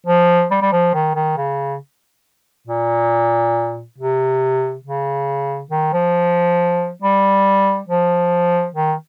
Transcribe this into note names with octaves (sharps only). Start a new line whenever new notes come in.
F3
G3
G3
F3
D#3
D#3
C#3
A#2
C3
C#3
D#3
F3
G3
F3
D#3